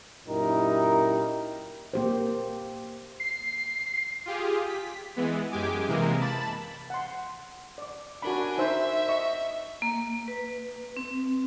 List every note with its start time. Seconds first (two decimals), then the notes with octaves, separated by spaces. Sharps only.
0.28 F#2 A#2 D#4 E4 G4 A#4
1.94 A#3 G4 C5
3.20 C7
4.26 F4 G4 G#4
4.68 B6
5.16 E3 G#3 B3
5.52 F#2 G#3 G4 G#5 D6
5.88 C3 E3 G#3 A#3 A#4
6.20 A5 B5 A6
6.90 F#5 C6
7.78 D5 D6
8.22 D4 F#4 A#4 G#5 B5
8.58 D#4 C5 E5 E6
9.08 D#5 C#6
9.82 A#3
10.28 B4
10.97 C4